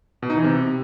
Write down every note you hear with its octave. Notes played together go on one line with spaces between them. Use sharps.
B2
D#4
E3
C3